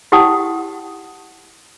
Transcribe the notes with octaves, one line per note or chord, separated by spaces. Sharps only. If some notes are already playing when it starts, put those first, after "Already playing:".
E4 G4 F#5 G5 A5 D#6